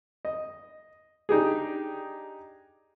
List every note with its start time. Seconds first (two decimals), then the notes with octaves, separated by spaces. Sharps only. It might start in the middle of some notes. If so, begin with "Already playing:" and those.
0.25 D#5
1.29 D4 D#4 G4 G#4